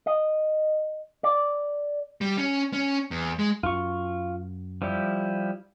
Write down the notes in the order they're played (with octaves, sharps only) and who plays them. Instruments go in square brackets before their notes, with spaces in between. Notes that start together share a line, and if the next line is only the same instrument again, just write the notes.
[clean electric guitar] D#5
D5
[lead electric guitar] G3
C#4
C#4
E2
G#3
[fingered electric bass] F#2 [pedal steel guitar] F4 C#6
[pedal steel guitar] F3 G3 E4